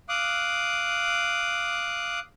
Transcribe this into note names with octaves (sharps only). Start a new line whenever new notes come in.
F5 D6 D#6 F#6